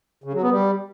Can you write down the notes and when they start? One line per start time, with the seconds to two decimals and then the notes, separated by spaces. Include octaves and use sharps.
0.24 C#3
0.33 F#3
0.42 B3
0.51 G3